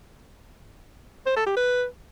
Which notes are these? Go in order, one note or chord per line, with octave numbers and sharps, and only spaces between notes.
C5
A4
G4
B4